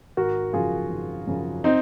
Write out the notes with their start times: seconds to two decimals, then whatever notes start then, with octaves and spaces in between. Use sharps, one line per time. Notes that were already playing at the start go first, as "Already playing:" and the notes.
0.17 G#1 F#4 A#4
0.53 F#2 C#3 F3 F4 G#4
0.90 G#1
1.27 F#2 C#3 F3
1.64 C4 D#4